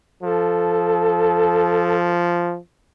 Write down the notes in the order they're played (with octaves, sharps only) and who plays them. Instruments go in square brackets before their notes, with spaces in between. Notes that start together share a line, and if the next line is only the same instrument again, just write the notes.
[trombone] F3 [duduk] A4